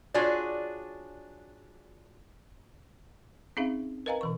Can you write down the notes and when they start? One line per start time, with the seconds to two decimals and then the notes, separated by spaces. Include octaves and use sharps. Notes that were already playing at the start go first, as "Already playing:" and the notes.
0.14 D4 F4 F#4 G#4 C#5 D5
3.57 C4 C#4 D#4 G#4 E5 F5
4.06 A#4 B4 D#5 F5 G#5 A#5
4.21 B2 E3 C#6